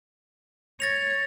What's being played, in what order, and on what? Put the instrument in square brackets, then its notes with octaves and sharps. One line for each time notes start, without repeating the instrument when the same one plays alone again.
[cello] C#5 [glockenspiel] A6 A#6 F7